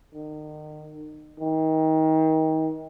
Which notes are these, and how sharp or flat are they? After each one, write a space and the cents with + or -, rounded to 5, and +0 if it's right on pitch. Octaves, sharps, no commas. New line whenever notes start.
D#3 -35
D#3 +30